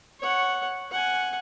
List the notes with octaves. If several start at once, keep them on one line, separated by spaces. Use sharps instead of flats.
C#5 F#5
F#5 G#5